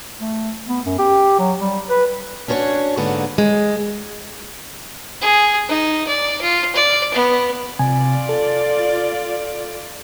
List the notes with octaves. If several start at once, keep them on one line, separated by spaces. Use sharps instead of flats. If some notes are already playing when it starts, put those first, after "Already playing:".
A3
B3
F#2
G4
F#3
G3
B4
C#4 D4 F#4 C5 C#5
G#2 D3 A#3 B3
G#3
G#4
D#4
D5
F4
D5
B3
C3 F4 D5 G#5
A4